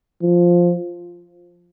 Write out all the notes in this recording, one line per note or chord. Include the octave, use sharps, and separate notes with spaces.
F3